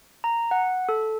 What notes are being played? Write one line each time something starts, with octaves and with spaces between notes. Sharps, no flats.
A#5
F#5
A4